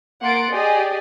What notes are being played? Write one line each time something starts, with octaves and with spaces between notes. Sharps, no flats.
A#3 F#5 C6 A6 D7
G4 G#4 D5 D#5 G#5